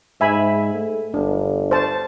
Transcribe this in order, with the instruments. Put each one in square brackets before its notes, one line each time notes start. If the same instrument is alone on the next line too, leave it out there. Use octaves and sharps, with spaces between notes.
[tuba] G#2 [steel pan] E5 G#5 B5
[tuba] A3
[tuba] G1 [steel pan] D4
[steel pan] C5 A5